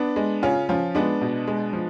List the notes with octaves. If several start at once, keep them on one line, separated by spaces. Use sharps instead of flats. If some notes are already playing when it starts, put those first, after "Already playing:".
Already playing: B3 D4
G#3
C#3 C#4 F4
F3 C#4 F4
G#3 B3 D4
B2
G#3
F3